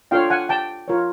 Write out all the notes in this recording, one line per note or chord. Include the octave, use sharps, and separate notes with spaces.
D4 F4 A4 C#5 F5 G5
F#5 G#5
G5 A5
F4 A#4 C#5